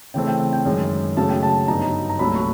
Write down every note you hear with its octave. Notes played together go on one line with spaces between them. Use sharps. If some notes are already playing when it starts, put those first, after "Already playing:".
C#3 E3 A3 C4 G5
G5
G5
G5
F#2 D#3 G#3
C#3 F#3 A3 C#4 A5
G5
A5
G2 D3 F#3 B3 D#4 A#5
A#5
C2 A#2 F#3 A3 B5
C#6